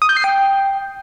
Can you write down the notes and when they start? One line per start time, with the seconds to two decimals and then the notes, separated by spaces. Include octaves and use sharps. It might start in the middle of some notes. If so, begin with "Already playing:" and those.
0.02 D#6
0.09 G6
0.17 C7
0.24 G5